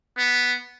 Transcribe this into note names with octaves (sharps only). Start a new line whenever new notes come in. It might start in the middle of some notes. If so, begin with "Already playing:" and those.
B3